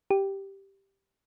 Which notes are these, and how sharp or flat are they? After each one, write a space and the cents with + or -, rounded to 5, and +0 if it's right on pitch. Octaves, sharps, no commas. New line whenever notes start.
G4 -5